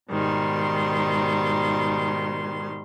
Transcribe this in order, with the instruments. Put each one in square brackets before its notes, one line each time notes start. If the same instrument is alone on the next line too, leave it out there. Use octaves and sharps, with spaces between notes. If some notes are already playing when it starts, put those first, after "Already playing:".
[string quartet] G#2 B2 D#3 G3 C6